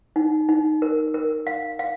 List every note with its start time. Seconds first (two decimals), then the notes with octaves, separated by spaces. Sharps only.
0.16 D#4
0.49 D#4
0.82 A#4
1.14 A#4
1.47 F5
1.79 F5